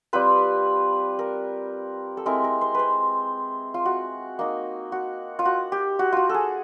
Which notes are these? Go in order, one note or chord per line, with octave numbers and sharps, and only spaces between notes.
G3 C4 F4 B4
A#4
A4
G#3 C4 E4 A#4
A#4
C5
B4 C5
F4
F#4
A#3 D#4
F#4
F4
F#4
G4
F#4
F4 F#4
G#4 A4